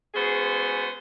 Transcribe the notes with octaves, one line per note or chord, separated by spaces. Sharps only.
G#3 B3 C#4 F#4 G#4 C5